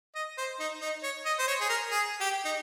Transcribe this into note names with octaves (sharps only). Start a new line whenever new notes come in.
D#5
C5
D#4
D#4
C#5
D#5
C5
C#5
G#4
A#4
G#4
G4
D#4